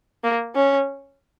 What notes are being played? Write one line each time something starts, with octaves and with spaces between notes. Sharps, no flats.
A#3
C#4